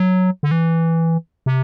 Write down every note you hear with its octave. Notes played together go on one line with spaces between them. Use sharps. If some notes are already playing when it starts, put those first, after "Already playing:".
Already playing: F#3
D3
E3
C3